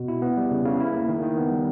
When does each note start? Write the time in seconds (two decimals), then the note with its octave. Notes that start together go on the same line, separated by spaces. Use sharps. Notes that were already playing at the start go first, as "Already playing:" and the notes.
Already playing: B2
0.08 E4
0.22 B3
0.37 G3
0.51 C#3
0.65 C#3
0.80 E4
0.93 A#3
1.09 D#3
1.22 D#3
1.37 B3
1.51 G3